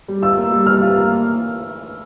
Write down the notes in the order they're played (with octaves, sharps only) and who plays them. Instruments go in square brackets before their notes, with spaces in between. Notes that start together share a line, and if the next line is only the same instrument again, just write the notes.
[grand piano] G3
[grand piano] F4 [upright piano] E6
[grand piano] A#3
G3
[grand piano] G3 [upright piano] F6
[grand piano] F4
A#3